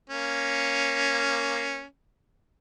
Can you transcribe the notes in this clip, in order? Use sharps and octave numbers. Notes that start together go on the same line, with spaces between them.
A#3 C#4